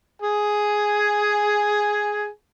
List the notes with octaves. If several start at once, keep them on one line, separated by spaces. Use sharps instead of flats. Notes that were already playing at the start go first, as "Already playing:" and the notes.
G#4 G#5